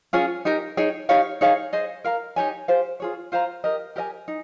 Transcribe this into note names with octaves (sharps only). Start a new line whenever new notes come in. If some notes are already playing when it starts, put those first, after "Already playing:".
C#4 F4 G#4 C#5
D#4 G4 A#4
D#4 G#4 C#5 G5
D#4 G4 C#5 F5
D#4 G#4 C#5 F5
G#4 C5 D#5
A#4 F5 A#5
D#4 G4 C#5 G#5
G4 C5 F5
F4 G#4 C#5
F4 C5 F5 A#5
G4 A#4 D#5
G4 A#4 D#5 G#5
D#4